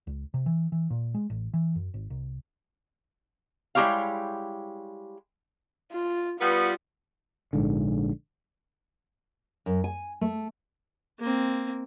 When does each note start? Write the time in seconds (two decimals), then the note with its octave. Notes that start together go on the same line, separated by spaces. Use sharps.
0.07 C#2
0.34 C3
0.46 E3
0.72 E3
0.90 A#2
1.14 G#3
1.30 A1
1.54 E3
1.76 F#2
1.94 G#1
2.10 C2
3.75 G3 G#3 E4 G4 C#5 F5
5.92 F4
6.41 G3 B3 F4
7.53 A#1 G#2 D3
9.66 F#2
9.84 G#5
10.21 A3
11.20 A#3 C4